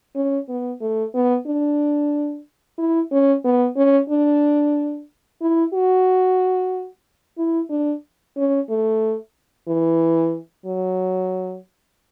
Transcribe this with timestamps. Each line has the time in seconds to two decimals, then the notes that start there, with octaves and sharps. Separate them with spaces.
0.15 C#4
0.49 B3
0.81 A3
1.14 B3
1.47 D4
2.78 E4
3.12 C#4
3.45 B3
3.76 C#4
4.10 D4
5.41 E4
5.74 F#4
7.38 E4
7.70 D4
8.37 C#4
8.69 A3
9.68 E3
10.66 F#3